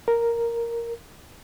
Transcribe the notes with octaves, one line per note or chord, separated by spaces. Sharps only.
A#4